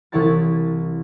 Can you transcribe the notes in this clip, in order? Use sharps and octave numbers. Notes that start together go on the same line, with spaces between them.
C2 E3 E4 C#5 A5 A6